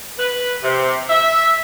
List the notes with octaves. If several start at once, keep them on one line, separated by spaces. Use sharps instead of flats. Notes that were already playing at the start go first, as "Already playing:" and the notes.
B4
C3
E5